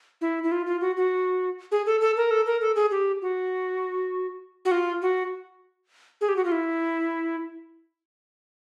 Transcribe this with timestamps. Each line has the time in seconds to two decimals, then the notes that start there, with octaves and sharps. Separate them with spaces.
0.21 E4
0.43 E4
0.52 F4
0.66 F4
0.81 F#4
0.97 F#4
1.72 G#4
1.86 A4
2.01 A4
2.17 A#4
2.31 A4
2.46 A#4
2.61 A4
2.76 G#4
2.91 G4
3.22 F#4
4.65 F#4
4.71 F4
5.02 F#4
6.21 G#4
6.29 G4
6.36 F#4
6.45 F4
6.52 E4